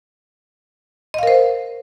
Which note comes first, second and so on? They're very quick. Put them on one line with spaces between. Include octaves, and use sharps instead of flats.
D#5 F5 A#4 C5